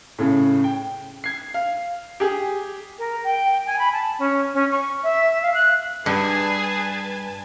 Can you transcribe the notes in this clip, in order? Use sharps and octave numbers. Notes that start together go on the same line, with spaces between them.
A2 C#3
G5
G#6 C7
F5
G4 G#4
A#4
G5
G#5
B5
A5
C#4
C#4
C#6
E5
F5
F#6
G2 G#4 B4 G#5 A5